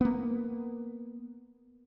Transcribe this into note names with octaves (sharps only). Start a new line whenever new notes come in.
A#3 B3